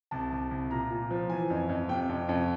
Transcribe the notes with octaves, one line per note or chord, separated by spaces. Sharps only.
C2 A5
C2
C2
A#2 A#5
A#2
F3
E3 G#5
F2
F2
C3 G5
F2
F2